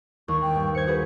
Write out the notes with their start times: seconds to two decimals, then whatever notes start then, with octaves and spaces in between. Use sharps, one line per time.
0.28 D#2 C#6
0.41 G5
0.54 G2
0.75 C5 G#6 C#7
0.87 F#4 G#4 B4